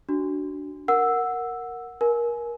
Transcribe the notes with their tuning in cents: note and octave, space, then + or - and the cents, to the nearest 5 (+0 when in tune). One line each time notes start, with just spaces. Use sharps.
D4 +0 F#4 +20
A#4 +0 F#5 -10 E6 +0
A#4 +25 G#5 +25